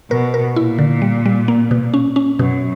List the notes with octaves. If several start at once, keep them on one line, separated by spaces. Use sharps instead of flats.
B2 A#4
A#4
A#2 E4
D3
G3
G3
A#3
B2
C#4
C#4
F#2 B2